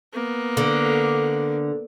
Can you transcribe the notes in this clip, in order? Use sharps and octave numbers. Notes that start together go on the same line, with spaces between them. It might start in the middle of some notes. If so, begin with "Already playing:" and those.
A#3 B3
D3